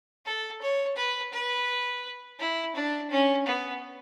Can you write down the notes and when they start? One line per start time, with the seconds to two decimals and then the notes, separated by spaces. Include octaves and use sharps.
0.25 A4
0.61 C#5
0.96 B4
1.33 B4
2.39 E4
2.76 D4
3.10 C#4
3.46 B3